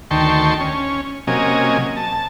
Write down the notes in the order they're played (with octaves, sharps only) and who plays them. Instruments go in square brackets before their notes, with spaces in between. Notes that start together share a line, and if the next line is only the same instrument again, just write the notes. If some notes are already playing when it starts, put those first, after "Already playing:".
[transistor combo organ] D2 D#3 G5 A5 C6 C#6
C#4
C3 F#3 A#3 C#4 D#5 G#5
A5